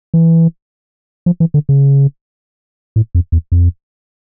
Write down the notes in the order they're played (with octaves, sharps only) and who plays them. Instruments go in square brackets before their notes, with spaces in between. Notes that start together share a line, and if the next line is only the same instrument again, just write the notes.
[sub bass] E3
F3
E3
D3
C#3
A2
F2
E2
F2